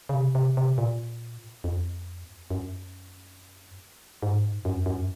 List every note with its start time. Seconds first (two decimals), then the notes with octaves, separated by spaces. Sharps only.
0.09 C#3
0.14 C3
0.35 C3
0.57 C3
0.78 A#2
1.64 F2
2.50 F#2
4.23 G#2
4.65 F#2
4.76 F2
4.86 F#2